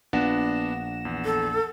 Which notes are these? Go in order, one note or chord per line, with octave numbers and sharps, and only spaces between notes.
A#1 B3 D4 F#5 A#6 E7
E2
A4